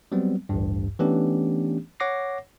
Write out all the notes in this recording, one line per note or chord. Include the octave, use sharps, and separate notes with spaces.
F#3 G3 B3 C4
A1 D2 G2
E3 A3 B3 C#4 D4 G4
C#5 F#5 D6 A#6 C7